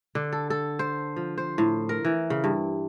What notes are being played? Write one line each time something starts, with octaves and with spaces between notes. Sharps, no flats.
D3
A4
A4
C5
F3
C5
A2
A#4
E3
C#3
G2